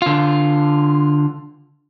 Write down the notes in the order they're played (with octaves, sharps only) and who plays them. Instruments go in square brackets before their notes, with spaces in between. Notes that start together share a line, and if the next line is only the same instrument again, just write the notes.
[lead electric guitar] D3 F4